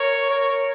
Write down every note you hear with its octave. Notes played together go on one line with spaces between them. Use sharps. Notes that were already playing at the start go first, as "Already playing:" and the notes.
Already playing: A#4 C#5
A#4 C#5